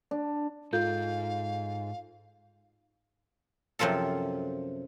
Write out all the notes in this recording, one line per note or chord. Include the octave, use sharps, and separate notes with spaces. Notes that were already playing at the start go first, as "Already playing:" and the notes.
D4
G#2 F4 A4 F5 G6
F#2 C3 F3 F4 A4